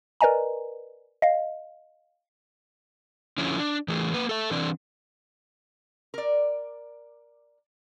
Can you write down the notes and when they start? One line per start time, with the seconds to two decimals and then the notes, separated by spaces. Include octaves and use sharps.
0.21 A#4 B4 D5 D#5 G#5 A#5
1.22 D#5 F5
3.38 D3 F3 C#4 E4
3.58 D4
3.88 E3 A3 G#4
4.14 A#3 B4
4.29 A4 E5
4.51 E3 C4 D4 D5
6.14 A#4 D5